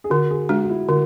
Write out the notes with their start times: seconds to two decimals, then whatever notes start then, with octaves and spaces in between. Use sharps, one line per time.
0.04 G#4
0.10 D3 F#4
0.30 G#4
0.49 G#3 D4 F#4
0.63 F#4
0.70 E4
0.89 D3 F#4